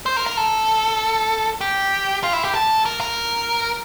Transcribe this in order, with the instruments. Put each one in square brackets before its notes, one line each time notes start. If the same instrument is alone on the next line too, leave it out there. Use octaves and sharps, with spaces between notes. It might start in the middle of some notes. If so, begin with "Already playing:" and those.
[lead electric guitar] C5
A#4
A#4
A4
G4
F4
E4
G4
A4
A#4
A#4